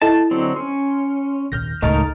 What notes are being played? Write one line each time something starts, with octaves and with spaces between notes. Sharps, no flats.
E4 A4 D#5 A5
D3 F#3 C4
C#4 C6
A#1 D#2 F6 G6 A#6
C#2 A2 A3 D#4 A#4 D#5 F6 A6